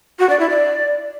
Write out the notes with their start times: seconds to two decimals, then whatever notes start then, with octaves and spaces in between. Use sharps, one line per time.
0.19 F#4
0.29 D5
0.40 E4
0.50 D5